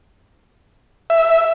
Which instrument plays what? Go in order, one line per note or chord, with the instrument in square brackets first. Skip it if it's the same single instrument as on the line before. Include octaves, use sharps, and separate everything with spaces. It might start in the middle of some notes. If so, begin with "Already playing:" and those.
[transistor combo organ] E5